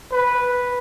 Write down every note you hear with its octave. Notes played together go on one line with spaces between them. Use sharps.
B4